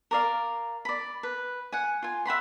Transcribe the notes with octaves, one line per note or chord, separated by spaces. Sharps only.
A#4 D5 F5
D5 B5
B4
F#5 G#5
F4 G#5
E5 F#5 B5 C6